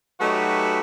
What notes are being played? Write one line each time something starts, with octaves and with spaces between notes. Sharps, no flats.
F#3 A3 D#4 F#4 G4 B4